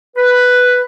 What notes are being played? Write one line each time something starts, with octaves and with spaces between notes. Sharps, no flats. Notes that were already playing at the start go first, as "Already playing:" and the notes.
B4